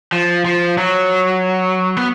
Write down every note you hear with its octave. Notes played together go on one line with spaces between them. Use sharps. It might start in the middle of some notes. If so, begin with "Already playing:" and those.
F3
F3
F#3
B3